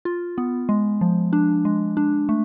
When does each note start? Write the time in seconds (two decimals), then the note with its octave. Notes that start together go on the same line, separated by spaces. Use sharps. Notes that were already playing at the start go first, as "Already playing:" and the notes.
0.05 F4
0.38 B3
0.69 G#3
1.01 F3
1.33 D4
1.65 G#3
1.97 D4
2.29 A3